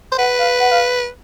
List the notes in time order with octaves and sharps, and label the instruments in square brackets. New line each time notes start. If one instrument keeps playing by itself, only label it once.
[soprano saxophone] C5
[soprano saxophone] B4 [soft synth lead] F#5
[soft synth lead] F5
F#5
F5